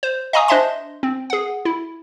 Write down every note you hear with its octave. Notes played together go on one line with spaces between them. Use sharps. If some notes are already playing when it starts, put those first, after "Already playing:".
C5
D#5 F5 G#5 A#5 C#6 D#6
D4 C5 D#5 E5 A5 C6
C4
G#4 F#5
E4